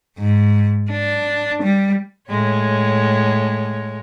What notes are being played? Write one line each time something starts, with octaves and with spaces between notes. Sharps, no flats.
G#2
D4
G3
A2 G#3 C#5